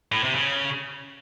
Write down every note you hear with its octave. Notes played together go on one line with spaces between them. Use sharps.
A2
C3
C#3